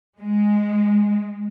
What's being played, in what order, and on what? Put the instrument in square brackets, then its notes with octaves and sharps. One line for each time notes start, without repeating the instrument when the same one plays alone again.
[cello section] G#3